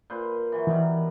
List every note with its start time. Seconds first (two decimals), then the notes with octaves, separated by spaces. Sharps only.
0.10 A#2 B4 C5
0.52 E3 F#3
0.67 B2 D#3 E3 G3